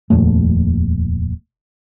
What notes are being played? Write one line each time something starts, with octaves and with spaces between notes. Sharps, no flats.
D#1 F2 A#2 A3